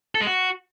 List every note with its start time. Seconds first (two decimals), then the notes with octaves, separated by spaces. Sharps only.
0.15 A4
0.21 G#3
0.27 F#4